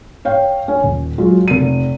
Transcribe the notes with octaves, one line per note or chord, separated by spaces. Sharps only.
C#5 F5 G5
C#4
D#1
F#3 G#3 F4
F1 D#7